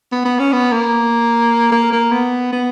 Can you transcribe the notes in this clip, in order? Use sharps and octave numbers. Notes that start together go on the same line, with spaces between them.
B3
B3
C#4
B3
A#3
A#3
A#3
B3
B3